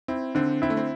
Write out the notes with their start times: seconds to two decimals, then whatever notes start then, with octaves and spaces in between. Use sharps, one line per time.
0.08 C4 E4
0.35 D3 C4
0.62 C4 E4
0.70 A3
0.77 C4